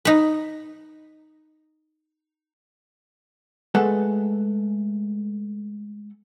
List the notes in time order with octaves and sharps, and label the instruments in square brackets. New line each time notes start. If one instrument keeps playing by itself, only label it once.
[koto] D#4 B4
[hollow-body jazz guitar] G#3 A3 A4 B4 F#5